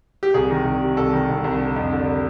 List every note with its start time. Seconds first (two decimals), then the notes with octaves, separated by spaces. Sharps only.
0.23 G4
0.34 C2 G#4
0.51 D#3
0.65 C2
0.81 C3
0.97 C2 A4
1.13 D#3
1.29 C2
1.44 C2
1.59 D3
1.76 F2
1.92 D3